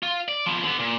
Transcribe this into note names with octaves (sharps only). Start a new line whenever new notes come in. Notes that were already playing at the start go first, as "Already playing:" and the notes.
F4
D5
F3 B3
D3 B3
A#2